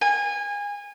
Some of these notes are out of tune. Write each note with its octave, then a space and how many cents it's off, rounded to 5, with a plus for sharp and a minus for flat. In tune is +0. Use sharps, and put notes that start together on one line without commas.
G#5 -25